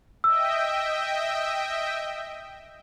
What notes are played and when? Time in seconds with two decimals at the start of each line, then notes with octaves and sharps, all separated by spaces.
0.24 D#5 E5 G5 E6